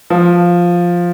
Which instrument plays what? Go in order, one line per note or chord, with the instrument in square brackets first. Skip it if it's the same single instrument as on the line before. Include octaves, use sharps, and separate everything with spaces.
[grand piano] F3